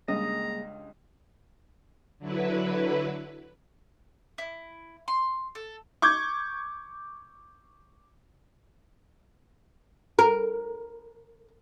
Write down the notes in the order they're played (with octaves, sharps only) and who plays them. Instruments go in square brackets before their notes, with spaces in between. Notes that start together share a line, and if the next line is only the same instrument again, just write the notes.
[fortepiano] C#2 G2 [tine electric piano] G3 A#3 G#4 [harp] D#5 [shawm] A#5
[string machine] D3 F#3 E4 B4
[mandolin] E4
C6
A4
[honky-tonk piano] C#6 D6 G6 G#6
[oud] A#4